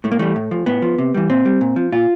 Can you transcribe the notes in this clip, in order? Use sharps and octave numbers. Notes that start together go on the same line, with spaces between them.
A2 A3
A#3
E3 G3 A3
A2
F3
A2 B3
F3
C3
E3 G3
A#2 C4
G3
A#2
F3
A#2 F4